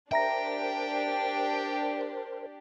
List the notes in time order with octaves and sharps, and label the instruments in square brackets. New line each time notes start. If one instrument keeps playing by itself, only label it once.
[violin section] D4 G4 [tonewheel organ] A#4 C5 [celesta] E5 A#5 A#6 [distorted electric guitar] G5